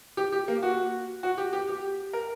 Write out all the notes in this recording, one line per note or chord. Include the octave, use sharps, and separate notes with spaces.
G4
G4
A#3
F#4
F#4
G4
G4
G4
A#4